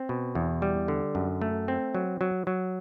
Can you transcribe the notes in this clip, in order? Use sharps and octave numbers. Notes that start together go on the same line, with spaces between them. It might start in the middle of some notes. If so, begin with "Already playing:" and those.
Already playing: C4
B2
E2
G3
D3
F#2
A3
C4
F#3
F#3
F#3